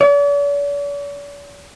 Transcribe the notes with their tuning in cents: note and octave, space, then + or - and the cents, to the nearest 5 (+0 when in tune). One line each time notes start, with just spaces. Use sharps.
D5 -45